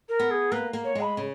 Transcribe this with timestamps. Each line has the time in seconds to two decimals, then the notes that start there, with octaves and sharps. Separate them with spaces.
0.09 A#4
0.19 B3
0.31 G#4
0.52 A#3 B4
0.73 A#3
0.84 C#5
0.95 G#3
1.01 B5
1.17 C#3